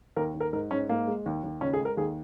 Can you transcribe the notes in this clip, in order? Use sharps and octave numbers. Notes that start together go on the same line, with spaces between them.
D#2 A#4
D#2
A#4
G#2 A#4
G#2 C#4
G#2 A#3
G#3
D#2
D#2
C#2 C#4
G#4
G#3
A#4
D#2 G#4